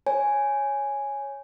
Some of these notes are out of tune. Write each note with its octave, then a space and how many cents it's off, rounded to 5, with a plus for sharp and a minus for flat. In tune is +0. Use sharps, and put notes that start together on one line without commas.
C#5 +0 G#5 +0